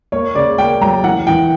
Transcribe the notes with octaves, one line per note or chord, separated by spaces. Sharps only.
A#3 C#5
C#3 D5
A#3 G5
F#3 A#5
E3 F#5
E3 G5